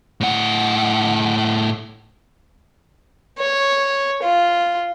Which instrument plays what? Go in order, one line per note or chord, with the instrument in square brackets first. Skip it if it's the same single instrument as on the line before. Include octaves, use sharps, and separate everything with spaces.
[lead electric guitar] A2 F#5
[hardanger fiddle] C#5
F4